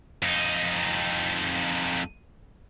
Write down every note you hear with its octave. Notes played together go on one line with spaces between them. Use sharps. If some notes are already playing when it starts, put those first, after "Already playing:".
F2 D#4